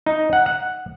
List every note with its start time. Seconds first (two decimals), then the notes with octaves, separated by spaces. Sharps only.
0.06 D#4
0.33 F#5
0.46 F#5